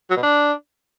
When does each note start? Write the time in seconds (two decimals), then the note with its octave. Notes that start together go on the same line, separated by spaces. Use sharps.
0.10 F#3
0.17 B2
0.23 D4